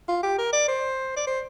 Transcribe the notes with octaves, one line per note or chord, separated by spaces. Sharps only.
F4
G4
A#4
D5
C5
D5
C5